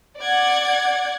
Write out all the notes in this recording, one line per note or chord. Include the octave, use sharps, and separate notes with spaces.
D5 F#5 G#6